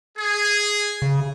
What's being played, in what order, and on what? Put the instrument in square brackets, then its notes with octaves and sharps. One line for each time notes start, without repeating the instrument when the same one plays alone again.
[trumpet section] G#4
[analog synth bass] C#3